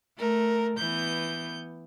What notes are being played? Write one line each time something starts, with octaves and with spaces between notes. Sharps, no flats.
A3 A#4
E3 B3 G6